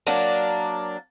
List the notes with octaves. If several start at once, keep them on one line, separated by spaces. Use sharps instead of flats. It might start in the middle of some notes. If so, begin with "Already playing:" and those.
F#3 A#3 D4